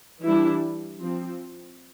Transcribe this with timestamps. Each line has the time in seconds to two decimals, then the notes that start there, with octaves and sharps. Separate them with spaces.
0.24 E3 G3 D4 E4
1.00 F3 C4